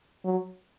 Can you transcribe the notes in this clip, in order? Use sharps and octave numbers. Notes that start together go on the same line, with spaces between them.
F#3